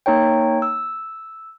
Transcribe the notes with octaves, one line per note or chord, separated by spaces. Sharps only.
A#3 D#4 C#5 G5
E6